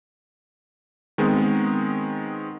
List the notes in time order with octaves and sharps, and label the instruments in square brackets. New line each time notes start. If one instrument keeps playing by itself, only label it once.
[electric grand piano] D#3 G#3 B3 C4